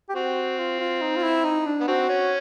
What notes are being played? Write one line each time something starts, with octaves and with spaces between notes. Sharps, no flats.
G4
C4 F#4
F4
F4
D#4
F4
E4
D#4
D4
B3
C4 F#4
C#4